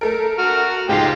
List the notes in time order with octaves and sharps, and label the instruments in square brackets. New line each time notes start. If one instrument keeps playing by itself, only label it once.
[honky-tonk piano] A3 A4 A#4
[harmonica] F#4 F6
[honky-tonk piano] C#2 G#2 C7 [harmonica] G#3 F4 G4